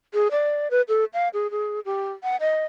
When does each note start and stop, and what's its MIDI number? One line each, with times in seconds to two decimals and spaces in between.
0.14 0.28 68
0.31 0.68 74
0.71 0.82 71
0.88 1.05 69
1.14 1.29 77
1.34 1.50 68
1.51 1.80 68
1.85 2.12 67
2.23 2.37 78
2.41 2.65 75